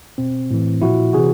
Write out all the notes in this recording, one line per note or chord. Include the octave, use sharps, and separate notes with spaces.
B2 C4
A2 E3
A#2 F3 E4 F#4
C3 E3 F#4 G#4